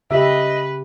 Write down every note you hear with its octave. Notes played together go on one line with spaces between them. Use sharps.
C#3 G4 B4 D#5 E5